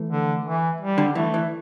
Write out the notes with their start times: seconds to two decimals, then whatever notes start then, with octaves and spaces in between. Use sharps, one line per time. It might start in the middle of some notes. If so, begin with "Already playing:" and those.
Already playing: E3 A3
0.10 D3
0.45 E3
0.81 G3
0.98 D3
1.15 E3 A3
1.34 E3